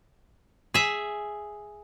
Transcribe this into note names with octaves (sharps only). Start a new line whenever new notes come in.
G#4 E5